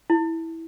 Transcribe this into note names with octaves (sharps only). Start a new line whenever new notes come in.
E4